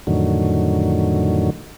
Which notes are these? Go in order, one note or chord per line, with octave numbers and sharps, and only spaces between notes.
F2 A2 D3 D#3 F#3